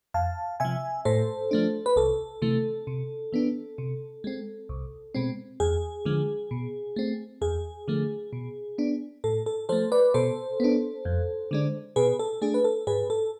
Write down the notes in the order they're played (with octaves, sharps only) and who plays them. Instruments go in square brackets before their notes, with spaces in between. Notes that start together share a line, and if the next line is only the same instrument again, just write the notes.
[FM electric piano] F2 F5 A5
C3 F3 E5 G#5
A2 A4 C5
F3 A3 D4
B4
C2 A4
C3 E3 A3
C3
E3 B3 D4
C3
G#3 C4
C2
B2 G#3 C4
E2 G#4
D3 F3 G#3
B2
A3 C4
E2 G#4
D3 F3 A3
B2
B3 D4
A2 A4
A4
F3 A3 A4 C5
B4 D5
B2 A4 C5
B3 D4
F2
D3 G#3 D4
B2 G#4 B4
A4
A3 D4 G#4
B4
A4
G#2 G#4 B4
A4